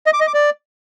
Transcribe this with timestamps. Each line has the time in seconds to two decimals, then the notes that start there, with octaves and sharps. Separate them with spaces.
0.06 D#5
0.13 D6
0.20 D#5
0.27 D6
0.34 D5